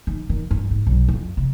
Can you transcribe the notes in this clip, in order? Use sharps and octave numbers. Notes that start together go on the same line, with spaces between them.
D#3
D#3
G2
G#2
B1
F2
C3